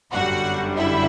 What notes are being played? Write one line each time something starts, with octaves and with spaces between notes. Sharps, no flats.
G1 F#2 D3 G3 F#4 F#5
E4 E5